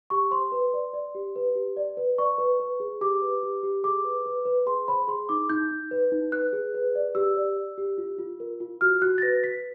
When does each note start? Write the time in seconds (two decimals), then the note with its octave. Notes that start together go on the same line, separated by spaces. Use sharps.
0.10 G4 C#6
0.31 C5 C6
0.52 B4
0.74 D5
0.93 D5
1.15 G4
1.36 B4
1.55 G4
1.77 D5
1.97 B4
2.18 D5 C#6
2.38 B4
2.60 B4
2.80 G#4
3.01 G4 D6
3.22 B4
3.43 G4
3.63 G4
3.84 G#4 D6
4.04 B4
4.26 B4
4.45 B4
4.66 G#4 C6
4.88 C5 B5
5.08 G#4 C6
5.29 D#4 D6
5.50 D#4 G6
5.71 D#4
5.91 B4
6.12 D#4
6.32 B4 F#6
6.53 G#4
6.74 B4
6.95 D5
7.15 G4 E6
7.37 D5
7.57 D5
7.78 G4
7.98 F4
8.19 F4
8.40 A#4
8.60 F4
8.81 F#4 F6
9.02 F#4 F#6
9.18 A6
9.22 B4 A#6
9.44 B4 B6